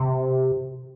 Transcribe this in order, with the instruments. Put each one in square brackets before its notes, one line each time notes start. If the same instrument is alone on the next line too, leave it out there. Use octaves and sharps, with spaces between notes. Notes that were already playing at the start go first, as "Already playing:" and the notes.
Already playing: [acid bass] C3